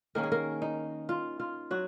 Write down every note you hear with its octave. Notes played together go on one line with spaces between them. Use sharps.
D#3 A#3 C#4 A#4
G#4
A#3 A#4
D#4
F4
F4
F#3 F#4